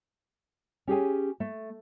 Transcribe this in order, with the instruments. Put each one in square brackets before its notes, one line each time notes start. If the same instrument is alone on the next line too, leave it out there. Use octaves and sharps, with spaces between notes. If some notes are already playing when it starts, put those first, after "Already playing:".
[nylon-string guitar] C#4 G4 G#4 G#5
A3